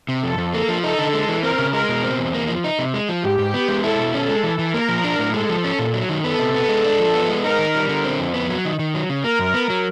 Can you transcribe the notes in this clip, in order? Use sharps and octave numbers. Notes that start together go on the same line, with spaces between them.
C3
F2 A4
F2
A#3 A4
F3
D#4 A4
D3
G#3
E3
C4 A#4
C#3
G#3 A#4
B2
C4
E2
A#3
F3
D#4
C3
G#3
F3
G#2 G4
G#2
B3
G#3
E4 A4
B2
C#4 A4
G#3
E3
E3
A#3 A#4
F3
D4
A2
G#3 A4
F3
C#4
A#2
F#3
D#3
B3 A4
C3
B3
G#3
D4
F3
B3
G#3
D#4 A#4
D#3
G3
D3
C4
F2
B3
F#3
D#3
D#3
F#3
C#3
A#3 A#4
F#2
B3
F#3